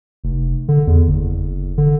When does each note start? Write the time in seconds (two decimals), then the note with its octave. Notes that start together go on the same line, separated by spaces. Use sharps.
0.24 F1
0.68 D3
0.87 E2
1.07 F#1
1.78 D3